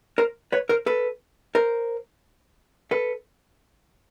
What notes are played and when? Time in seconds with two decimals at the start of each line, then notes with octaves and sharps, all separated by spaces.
0.18 A#4 C5
0.52 B4 C#5
0.69 A#4 C5
0.86 A4 B4
1.55 A#4 C5
2.91 A4 B4